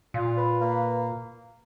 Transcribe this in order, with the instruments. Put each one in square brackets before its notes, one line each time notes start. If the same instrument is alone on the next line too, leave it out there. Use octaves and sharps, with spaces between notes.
[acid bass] A#2 [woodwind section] F4
[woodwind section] B4
A#3